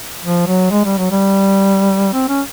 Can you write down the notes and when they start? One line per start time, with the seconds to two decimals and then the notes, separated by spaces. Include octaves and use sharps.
0.24 F3
0.47 F#3
0.71 G#3
0.85 G3
0.98 F#3
1.11 G3
2.13 C4
2.29 C#4